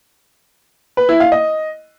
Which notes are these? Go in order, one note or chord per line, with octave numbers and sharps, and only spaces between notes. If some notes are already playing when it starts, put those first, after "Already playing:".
B4
E4
F5
D#5